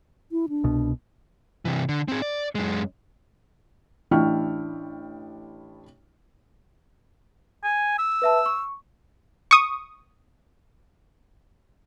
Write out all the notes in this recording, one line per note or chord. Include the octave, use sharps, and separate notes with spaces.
E4
D4
C2 B2
C3 E3
D3
C4 G#4
D5
F#2 G#3
A1 D4 E4 G5 C#6 F6
G#5
E6
B4 E5 A5
C#6
C#6 D#6